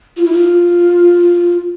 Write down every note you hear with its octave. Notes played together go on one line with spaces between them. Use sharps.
F4
E4
F4